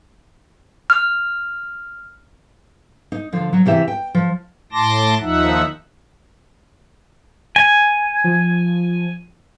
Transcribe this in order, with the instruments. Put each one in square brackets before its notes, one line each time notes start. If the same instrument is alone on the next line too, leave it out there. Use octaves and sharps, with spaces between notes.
[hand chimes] F6
[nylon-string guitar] D#4
D3 F3
F#3 F#4
C3 E3 G4 E5
G5
F3
[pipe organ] A2 A5 C6 D6 A#6
D#2 F3 D#4 E5 F#5
[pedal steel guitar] G#5
[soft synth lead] F3